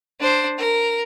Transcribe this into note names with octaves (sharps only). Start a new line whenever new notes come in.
D4 C5
A#4